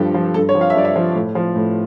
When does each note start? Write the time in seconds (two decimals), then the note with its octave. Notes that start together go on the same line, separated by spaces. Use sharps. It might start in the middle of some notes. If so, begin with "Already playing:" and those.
Already playing: G2 F3 G4 A4
0.14 F3
0.34 G2 A4
0.49 C#5
0.55 F3
0.61 F5
0.70 E5
0.75 G2 D5
0.85 E5
0.96 F3
1.15 A2
1.35 F3
1.56 A2